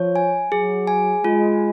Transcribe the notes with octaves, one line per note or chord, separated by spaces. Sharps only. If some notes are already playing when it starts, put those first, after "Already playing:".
Already playing: F3 C#5
G#5
F#3 G#4
G#5
G#3 F4